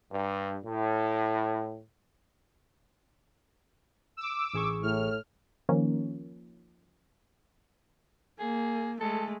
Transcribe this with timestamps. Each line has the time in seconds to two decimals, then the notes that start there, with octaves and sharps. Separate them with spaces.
0.11 G2
0.65 A2
4.17 D6 E6
4.54 A1 G#4 C#6
4.82 A2 F6
5.69 D#3 F3 A#3 C#4
8.39 A#3 G#4
9.00 G#3 A3 A4